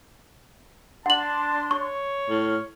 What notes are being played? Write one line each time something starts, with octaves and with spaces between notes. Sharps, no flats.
D4 F#5 A5 C6 F#7
C#5 C#6
A2 F6